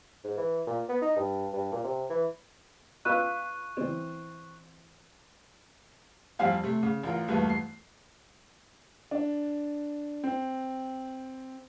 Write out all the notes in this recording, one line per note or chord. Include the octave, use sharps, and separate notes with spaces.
G#2
E3
A#2
B3
D#4
G2
G2
A#2
C3
E3
F4 B4 C#6 E6 F#6 D#7
E3 C4
F2 G3 C4 F5 G#5
C3 A3
C#3
A1 F4 A#4
E1 G2 A3 A#3 B4
C7
D4
C4